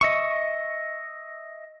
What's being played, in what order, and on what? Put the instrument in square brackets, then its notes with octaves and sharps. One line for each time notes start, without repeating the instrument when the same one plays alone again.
[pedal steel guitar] D#5 E5 C#6